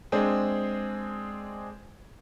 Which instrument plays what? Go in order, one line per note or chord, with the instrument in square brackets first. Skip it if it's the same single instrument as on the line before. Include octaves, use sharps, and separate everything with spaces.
[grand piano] G#3 C4 D4 G#4